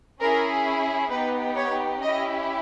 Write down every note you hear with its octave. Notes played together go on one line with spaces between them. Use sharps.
C#4 E4 G#4 A#4
B3 D#4 G4 B4
C#5
C#4 E4 G4 D#5